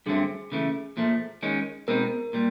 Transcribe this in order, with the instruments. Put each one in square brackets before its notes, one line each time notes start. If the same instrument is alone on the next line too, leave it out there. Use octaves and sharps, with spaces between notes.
[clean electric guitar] G2 D3 F#3 A3 C4 [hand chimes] G#4
[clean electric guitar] C#3 E3 A3
A#2 F3 A3
D#3 G#3 C#4
[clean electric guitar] B2 G#3 C4 D#4 [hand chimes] A#4
[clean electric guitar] A#2 G3